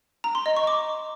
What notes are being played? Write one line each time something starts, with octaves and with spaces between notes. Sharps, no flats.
A#5
C6
D#5
C#6
D6